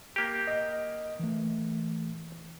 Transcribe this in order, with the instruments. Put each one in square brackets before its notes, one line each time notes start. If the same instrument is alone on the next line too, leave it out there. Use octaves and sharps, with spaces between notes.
[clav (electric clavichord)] A#3 G4
[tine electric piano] D#5
E3 A3